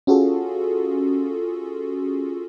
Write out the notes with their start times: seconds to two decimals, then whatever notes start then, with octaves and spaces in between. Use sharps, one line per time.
0.07 C#4 F4 F#4 G#4 A4